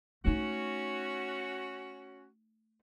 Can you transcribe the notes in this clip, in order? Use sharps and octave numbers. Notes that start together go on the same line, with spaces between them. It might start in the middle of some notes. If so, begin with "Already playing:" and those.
A3 C#4 D#4 F#4